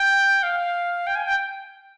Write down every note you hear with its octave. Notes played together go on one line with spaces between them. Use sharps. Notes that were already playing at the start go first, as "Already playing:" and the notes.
Already playing: G5
F5
G5
G#5
G5